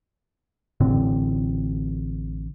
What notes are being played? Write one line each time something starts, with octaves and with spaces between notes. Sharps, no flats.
A1 A2 D3 C4